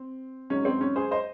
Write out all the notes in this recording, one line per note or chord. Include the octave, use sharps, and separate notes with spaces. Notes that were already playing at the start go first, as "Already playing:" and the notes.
Already playing: C4
G#2 F#3 C#4
C4
C#4
G#4 C5
C5 D#5